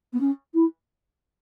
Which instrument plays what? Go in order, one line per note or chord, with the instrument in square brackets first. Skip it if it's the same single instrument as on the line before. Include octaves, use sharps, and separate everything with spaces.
[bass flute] B3
C#4
E4